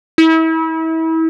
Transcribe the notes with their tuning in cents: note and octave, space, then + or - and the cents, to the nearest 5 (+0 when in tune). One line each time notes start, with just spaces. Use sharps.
E4 -35